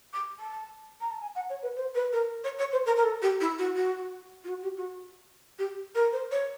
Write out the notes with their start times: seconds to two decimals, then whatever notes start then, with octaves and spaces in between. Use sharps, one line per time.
0.13 D6
0.39 A5
1.01 A#5
1.11 A5
1.21 G#5
1.35 F#5
1.49 C#5
1.62 B4
1.76 C5
1.95 B4
2.12 A#4
2.44 C#5
2.58 C#5
2.72 C5
2.86 A#4
2.96 A#4
3.03 A4
3.22 G4
3.40 E4
3.58 F#4
3.76 F#4
4.44 F4
4.48 F#4
4.63 G4
4.77 F#4
5.58 G4
5.95 A#4
6.12 C5
6.31 C#5